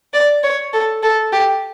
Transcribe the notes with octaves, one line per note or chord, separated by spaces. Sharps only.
D5
C#5
A4
A4
G4